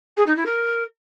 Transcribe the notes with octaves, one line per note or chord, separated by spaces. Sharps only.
G#4
D#4
E4
A#4